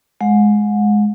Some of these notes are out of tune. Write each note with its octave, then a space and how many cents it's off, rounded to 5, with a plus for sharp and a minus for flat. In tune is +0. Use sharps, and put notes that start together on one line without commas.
G#3 +10 F#5 -35